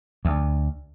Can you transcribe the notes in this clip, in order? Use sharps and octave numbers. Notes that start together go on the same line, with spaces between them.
D2